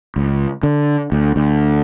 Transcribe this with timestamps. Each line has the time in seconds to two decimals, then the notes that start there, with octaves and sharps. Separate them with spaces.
0.16 C#2
0.63 D3
1.12 D2
1.36 D2